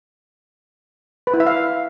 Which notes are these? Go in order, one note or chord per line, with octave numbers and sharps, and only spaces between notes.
B4
E4
E5
F5